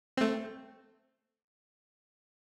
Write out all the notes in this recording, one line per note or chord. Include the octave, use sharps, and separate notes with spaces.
A3 C4